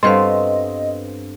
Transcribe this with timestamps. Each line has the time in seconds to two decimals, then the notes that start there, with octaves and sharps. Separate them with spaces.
0.03 G2 B3 C4 A4 C5 D#5 F5 C6